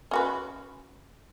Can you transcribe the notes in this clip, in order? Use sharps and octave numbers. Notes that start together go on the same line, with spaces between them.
C#4 F#4 B4